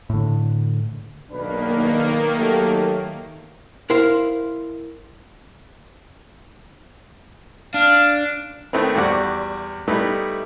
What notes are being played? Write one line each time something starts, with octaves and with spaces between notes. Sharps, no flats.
A2 D3
B1 D#3 A#3 D4 B4
F#3 A3 G4
E4 A#4 C5 E5 F5
D4 F5
D#3 A3 B3 C4
E2 G3 F#4 D5 F#5
G3 A3 B3 D#4 E4